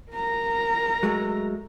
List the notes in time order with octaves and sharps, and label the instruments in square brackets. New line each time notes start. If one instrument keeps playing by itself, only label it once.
[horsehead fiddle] A#4 A#5
[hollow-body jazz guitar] F#3 G#3 A3